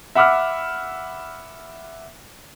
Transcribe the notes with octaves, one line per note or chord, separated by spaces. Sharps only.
E5 F#5 B5 D6 E6 F6